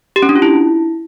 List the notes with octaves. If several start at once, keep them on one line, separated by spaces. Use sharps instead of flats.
G4
C#4
D4
F4
E4